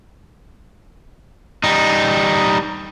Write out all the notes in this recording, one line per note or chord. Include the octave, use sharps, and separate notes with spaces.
G3 D#4